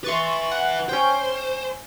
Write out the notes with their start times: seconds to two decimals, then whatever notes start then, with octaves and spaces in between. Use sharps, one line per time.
0.04 B4 E5 C6 C#6 A6
0.51 F#5
0.89 C#4 C5 G5